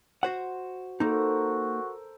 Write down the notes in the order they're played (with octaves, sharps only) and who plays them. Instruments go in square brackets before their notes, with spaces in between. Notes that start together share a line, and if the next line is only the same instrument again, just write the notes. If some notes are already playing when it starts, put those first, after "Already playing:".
[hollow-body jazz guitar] F#4 C5 F#5
[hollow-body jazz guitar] A#3 D#4 [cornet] F#4 [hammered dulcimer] A4 A#4 C5